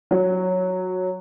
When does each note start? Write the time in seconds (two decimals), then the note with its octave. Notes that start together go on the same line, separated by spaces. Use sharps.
0.11 F#3